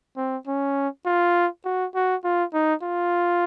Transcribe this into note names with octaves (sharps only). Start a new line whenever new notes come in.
C4
C#4
F4
F#4
F#4
F4
D#4
F4